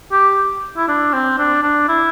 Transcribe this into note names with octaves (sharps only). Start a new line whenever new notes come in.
G4
E4
D4
C4
D4
D4
E4